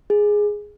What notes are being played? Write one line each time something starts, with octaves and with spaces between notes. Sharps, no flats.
G#4